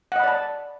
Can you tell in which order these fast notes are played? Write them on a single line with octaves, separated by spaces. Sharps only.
F#5 D#5 B5 D5 A5